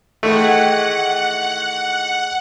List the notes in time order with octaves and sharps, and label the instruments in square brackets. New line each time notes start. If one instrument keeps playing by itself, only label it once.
[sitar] D#3 E3 G#3 [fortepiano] A3 [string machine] F#5